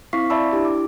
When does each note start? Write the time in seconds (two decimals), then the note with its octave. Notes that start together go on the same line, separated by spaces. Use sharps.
0.13 C4 E4 F5 C#6 B6 C7
0.30 D5 E5 A5 B5 E6
0.53 D4 E4 G4
0.65 D6